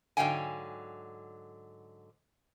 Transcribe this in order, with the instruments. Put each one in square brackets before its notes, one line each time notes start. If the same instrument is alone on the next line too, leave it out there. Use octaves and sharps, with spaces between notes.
[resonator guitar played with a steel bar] G#2 D3 F#3 F5 G5 G#5